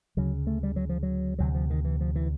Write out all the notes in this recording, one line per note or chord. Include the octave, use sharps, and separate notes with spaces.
D2 C#3 F#3
A3
G3
F#3
F3
F#3
D2 C3 F#3
F3
D#3
E3
F3
E3